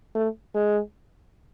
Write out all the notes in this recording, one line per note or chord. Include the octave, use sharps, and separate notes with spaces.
A3
G#3